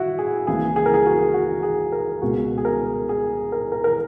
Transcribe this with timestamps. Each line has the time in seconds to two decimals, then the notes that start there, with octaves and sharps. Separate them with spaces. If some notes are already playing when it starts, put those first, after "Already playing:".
Already playing: E4 F#4
0.19 G#4
0.47 C#2 C#3 E3 A#3 G#4
0.76 G#4
0.86 A#4
0.94 G#4
1.06 F#4
1.34 F#4
1.63 G#4
1.92 A#4
2.22 C#2 B2 G#3 F#4
2.58 G#4
2.65 A#4
3.09 G#4
3.52 A#4
3.72 A#4
3.84 A#4